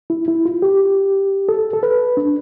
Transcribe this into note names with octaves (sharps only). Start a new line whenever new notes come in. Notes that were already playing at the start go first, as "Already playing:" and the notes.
E4
E4
F4
G4
A4
A4
B4
D4